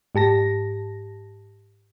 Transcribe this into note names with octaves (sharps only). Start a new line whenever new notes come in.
G#2 G4 A5 A#6